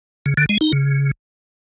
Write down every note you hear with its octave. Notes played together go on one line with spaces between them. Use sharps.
C#3
D3
G#3
D#4
C#3